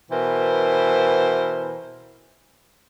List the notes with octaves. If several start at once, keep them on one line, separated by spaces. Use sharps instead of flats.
B2 E3 A#4 C5